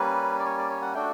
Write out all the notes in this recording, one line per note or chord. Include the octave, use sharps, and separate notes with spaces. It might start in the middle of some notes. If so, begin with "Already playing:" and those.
Already playing: G3 A#3 C#4 B4
D5
C#5
D5
C#5
F#5
A3 D4 F#4 G5